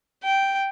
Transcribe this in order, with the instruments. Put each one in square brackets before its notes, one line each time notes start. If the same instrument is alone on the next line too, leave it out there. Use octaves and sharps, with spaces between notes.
[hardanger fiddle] G5